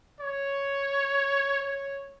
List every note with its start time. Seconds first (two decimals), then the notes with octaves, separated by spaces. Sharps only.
0.20 C#5
1.62 C#5